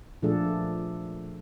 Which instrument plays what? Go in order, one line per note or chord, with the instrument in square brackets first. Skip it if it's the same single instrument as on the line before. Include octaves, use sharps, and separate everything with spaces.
[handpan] A#2 F3 A3 D4 G#4 A4